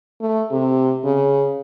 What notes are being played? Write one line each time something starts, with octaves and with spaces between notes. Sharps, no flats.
A3
C3
C#3